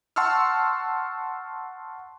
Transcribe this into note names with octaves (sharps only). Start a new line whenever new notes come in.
F#5 A5 C6 C#6 E6 F6